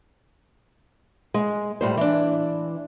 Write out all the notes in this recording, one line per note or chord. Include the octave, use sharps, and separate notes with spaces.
G#3
A2 G3 C5
E3 D4